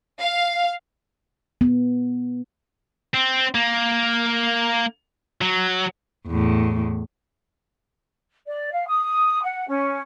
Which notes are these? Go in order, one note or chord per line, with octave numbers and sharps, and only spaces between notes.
F5
B3
C4
A#3
F#3
E2 A2
D5
F5
D#6
F#5
C#4